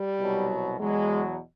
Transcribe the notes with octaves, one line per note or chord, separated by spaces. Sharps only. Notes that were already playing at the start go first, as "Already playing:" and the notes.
Already playing: G3
C2 B2 F#3
E2 B2 F#3 G#3